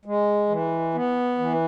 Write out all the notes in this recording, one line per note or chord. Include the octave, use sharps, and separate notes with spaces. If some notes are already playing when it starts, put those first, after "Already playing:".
G#3
E3
B3
E3